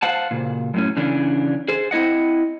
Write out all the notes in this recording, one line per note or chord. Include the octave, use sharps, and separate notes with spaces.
C5 F5 F#5 A5
A#2 C#3
F#2 A2 C#4
C#3 E3 C#4 D4
G#4 C5
C4 E4 D#5 F#5